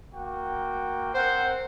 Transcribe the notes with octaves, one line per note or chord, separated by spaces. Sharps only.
A#3 F#4 G5
C4 A#4 C5 F#5